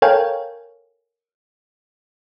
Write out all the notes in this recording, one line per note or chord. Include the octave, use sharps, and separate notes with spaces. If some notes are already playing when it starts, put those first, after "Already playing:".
A4 A#4 C#5 F5 G5 G#5